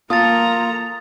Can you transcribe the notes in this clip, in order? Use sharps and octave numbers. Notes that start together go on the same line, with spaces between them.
A#3 F4 A4 A#5 D#6 A6